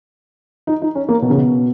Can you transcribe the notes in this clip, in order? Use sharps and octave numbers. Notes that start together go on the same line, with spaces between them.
D#4
D#4
C#4
A#3
B2
C#3
B2